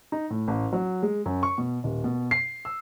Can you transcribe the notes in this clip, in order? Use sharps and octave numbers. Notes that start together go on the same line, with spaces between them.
D#4
A2
A1
F#3
G#3
F#2
C#6
B2
D#1
B2
C7
E6